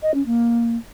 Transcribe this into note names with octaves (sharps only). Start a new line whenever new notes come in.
D#5
C#4
A#3